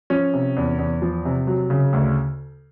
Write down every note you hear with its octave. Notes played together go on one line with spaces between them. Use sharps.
F3 C#4
C3
E2
E2
F3
C3
F#3
C#3
D2